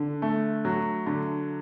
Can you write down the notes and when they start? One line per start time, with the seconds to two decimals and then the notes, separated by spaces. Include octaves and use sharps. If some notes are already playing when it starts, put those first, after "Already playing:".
Already playing: D3
0.22 A3
0.65 F#3
1.06 D3